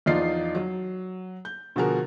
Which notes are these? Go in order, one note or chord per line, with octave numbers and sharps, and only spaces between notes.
E2 F3 D#4 F4 D5 C7
F#3
G6
B2 D3 F3 F#4 G#4 A#4